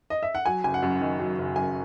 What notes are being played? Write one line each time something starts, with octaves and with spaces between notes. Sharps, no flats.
D#5
E5
F#5
F#3 G#5
F#1 G#5
F#5
F#2
D#3
F#3
F#1
F#2 G#5